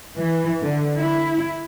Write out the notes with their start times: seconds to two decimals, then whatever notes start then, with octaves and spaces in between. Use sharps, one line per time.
0.17 E3
0.61 D3
0.97 E4